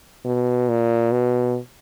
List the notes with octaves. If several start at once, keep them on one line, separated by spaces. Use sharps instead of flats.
B2
A#2
B2